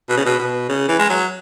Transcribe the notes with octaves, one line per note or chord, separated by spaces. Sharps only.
B2
C#3
B2
B2
C#3
E3
G#3
F#3